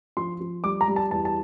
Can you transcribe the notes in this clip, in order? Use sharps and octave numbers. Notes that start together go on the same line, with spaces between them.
F3 C6
F3
G3 D6
A#5
G3
A5
E2 A5
A5